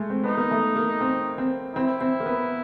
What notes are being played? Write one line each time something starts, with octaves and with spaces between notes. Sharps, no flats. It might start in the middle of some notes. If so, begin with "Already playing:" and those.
Already playing: G#3 A3
C4
B3 D#4
A#3
A3
A#3
C4
C4
C4 E4
C4
A#3
B3